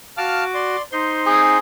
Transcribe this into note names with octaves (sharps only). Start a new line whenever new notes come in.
F#4 F5 A5 D6 F6
D5 C6
D#4 C5 C6
C4 G#4